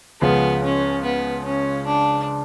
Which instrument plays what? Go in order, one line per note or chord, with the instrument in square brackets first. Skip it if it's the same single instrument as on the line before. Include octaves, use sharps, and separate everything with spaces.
[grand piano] C#2 C#3 F3 [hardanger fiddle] B3
[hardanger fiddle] C#4
B3
C#4
D4